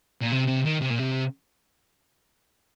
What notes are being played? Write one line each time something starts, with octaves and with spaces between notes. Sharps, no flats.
A#2
C3
C3
D#3
C3
A#2
C3